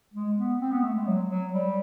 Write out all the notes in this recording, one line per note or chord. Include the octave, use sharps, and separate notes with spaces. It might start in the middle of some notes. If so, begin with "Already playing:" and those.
G#3
B3
C4
B3
A3
G#3
F#3
F#3
G3